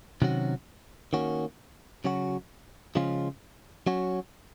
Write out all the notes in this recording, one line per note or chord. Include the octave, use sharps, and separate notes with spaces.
C3 D#3 F#3 C#4 F#4
D#3 A#3 C#4 F#4
C#3 F#3 C#4 F#4
C#3 F3 G#3 C#4 F4
F#3 C#4 F#4